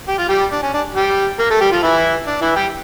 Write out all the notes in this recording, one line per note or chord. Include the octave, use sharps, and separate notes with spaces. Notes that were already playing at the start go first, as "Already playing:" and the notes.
G4
F4
G3 G4
D4
C#4
D4
G3 G4
A#3 A#4
A3 A4
G3 G4
F3 F4
E3 E4
D4
E3 E4
G3 G4